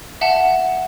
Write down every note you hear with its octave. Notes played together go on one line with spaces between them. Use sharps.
E5 F#5 A5